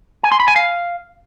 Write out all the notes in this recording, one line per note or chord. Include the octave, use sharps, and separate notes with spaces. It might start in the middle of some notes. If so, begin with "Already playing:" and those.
G#5
C6
B5
G#5
F5